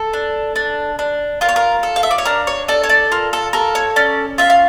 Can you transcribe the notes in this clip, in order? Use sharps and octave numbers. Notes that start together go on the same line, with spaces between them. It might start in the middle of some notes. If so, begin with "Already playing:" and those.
Already playing: A4
D4
D4
D4
F4 A#4
C#5
A#4
A4
F5
E5
D5
C#5
D4 A#4
C#5
A4 D5
C#5
D5
F4 A#4
A4
A4 A#4
C#5
C#4 D5
F4 E5
F5